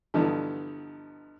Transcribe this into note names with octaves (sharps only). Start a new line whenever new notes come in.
G2 D3 E3 F3 B3 D#4